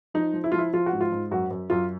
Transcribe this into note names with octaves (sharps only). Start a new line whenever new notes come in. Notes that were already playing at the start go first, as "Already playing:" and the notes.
F3 D#4
F3
E4
F3 F4
E4
F3 F4
F#4
G#2
F4
G#2
F#2 F#4
F#2
F#2 F4